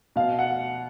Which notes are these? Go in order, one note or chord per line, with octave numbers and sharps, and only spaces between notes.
B2 F5
F#5